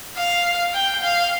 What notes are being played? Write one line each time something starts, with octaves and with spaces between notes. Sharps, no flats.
F5
G5
F5